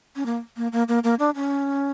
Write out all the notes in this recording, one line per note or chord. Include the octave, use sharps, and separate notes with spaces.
C#4
A#3
A#3
A#3
A#3
A#3
D4
C#4